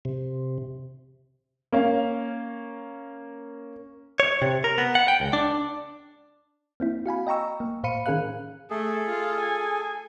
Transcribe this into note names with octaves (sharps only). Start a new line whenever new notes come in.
C3
A#3 C#4 F5
C#5
C3
A#4
B3
F#5
G5
C#2
D4
A#3 C4 E4
F#4 F5 G#5 B5
D#5 G5 A#5 C#6 E6
A#3
A2 C5 F5 B5 C#7 D#7
D#3 C#4 G#4 A#4 F5 F#6
A3 G#4 A4
F4
G#5